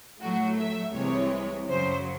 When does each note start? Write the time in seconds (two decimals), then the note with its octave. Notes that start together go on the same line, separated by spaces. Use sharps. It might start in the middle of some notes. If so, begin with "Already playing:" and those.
0.21 A2 F#3 A3 F#4
0.58 E5
0.94 C2 C3 E3 G#3 C#5
1.67 F#2 C#3 F#3 C5